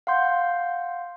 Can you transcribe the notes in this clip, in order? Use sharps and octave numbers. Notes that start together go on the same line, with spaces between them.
F5 F#5 C6 G6